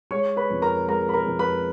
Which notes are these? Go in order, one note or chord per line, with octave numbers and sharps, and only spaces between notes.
G#3 C#5 C#6
B4 B5
F2
A#4 A#5
G#3 A#4 A#5
B5
A#4 A#5
F2
B4 B5